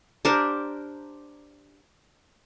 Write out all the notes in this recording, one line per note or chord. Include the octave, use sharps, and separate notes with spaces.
D4 G4 A#4 C5